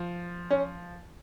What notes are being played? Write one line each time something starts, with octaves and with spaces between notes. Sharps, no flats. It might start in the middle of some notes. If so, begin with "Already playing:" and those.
Already playing: F3
C#4